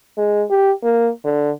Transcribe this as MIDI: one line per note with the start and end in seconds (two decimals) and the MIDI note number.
0.17 0.44 56
0.50 0.72 67
0.84 1.10 58
1.25 1.51 50